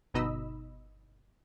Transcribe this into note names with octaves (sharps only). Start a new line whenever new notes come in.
G1 B2 D#4 D#5 B5 E6